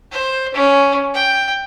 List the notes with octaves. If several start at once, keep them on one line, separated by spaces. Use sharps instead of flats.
C5
C#4
G5